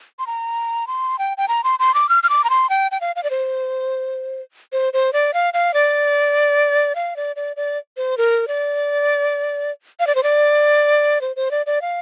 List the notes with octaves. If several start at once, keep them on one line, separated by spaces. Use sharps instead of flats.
C6
A#5
C6
G5
G5
A#5
C6
C6
D6
F6
F6
D6
A#5
C6
G5
G5
F5
F5
D5
C5
C5
C5
D5
F5
F5
D5
F5
D5
D5
D5
C5
A#4
D5
F5
D5
C5
D5
C5
C5
D5
D5
F5